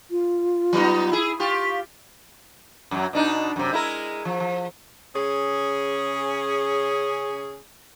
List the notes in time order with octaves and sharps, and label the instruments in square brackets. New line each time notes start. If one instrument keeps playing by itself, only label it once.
[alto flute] F4
[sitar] F#3 B3 D#4
E4 G#4
[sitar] F4 G4 [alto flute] C#6
[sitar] F#2 F#3
B2 D4 D#4
F#2 C3
G#3 E4 A#4
F3
F3
[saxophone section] C#3 C#4 G#4